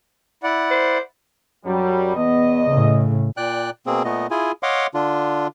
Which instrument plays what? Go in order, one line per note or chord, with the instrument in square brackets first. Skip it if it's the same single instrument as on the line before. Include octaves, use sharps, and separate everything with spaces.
[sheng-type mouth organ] E4 D5 F#5
[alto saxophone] C5
[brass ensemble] F#2 F#3 G3
[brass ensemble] E2 D#5 [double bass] B3
[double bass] A2 C#3
[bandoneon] A#2 D5 G5 F#6
B2 A#3 C4 G#4
A#2 A3 B3 D#5
E4 F4 G#4 G#5
C#5 D#5 F5 F#5 C6 D6
D3 D4 F4